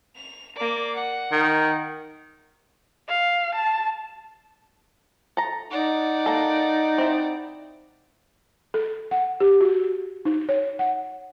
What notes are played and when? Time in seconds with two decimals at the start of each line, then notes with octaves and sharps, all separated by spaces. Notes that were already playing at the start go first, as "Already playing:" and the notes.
0.15 F7
0.56 A#3 D5
0.94 F#5
1.32 D#3
3.09 F5
3.55 A5
5.37 A4 A#5
5.71 D#4 D5 F#5
6.26 A#3 A4
6.98 C4 E4
8.74 A4
9.11 F#5
9.40 G4
9.61 F#4
10.25 D#4
10.49 C#5
10.79 F#5